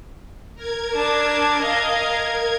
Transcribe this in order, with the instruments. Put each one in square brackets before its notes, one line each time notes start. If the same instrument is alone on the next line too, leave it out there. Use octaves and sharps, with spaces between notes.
[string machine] A#4 G#6
[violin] D4 A5
D#5 F5